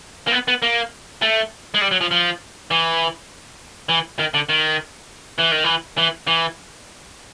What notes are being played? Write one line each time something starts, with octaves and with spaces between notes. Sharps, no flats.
A#3
B3
B3
A#3
A3
G#3
G3
F#3
F3
F3
E3
E3
D#3
D3
D#3
E3
D#3
E3
E3
E3